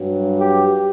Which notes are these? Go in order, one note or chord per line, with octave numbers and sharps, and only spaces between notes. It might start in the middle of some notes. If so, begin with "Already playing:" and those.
Already playing: G2 F#3
G4